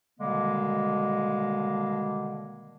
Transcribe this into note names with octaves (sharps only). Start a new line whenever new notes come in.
B2 D3 D#3 G3 G#3 A#3